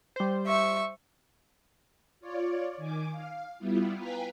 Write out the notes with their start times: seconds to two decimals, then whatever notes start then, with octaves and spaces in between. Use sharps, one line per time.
0.16 G3 C5
0.47 E5 C#6
2.20 F4 C#5 D5
2.77 D#3 G#5 D6
3.11 F5
3.59 G3 B3 E4 F4
3.97 B4 F5 G5 G#5 A#5 B6